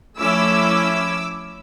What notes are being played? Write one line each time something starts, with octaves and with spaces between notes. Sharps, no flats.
F3 A3 C#4 E4 D6 E6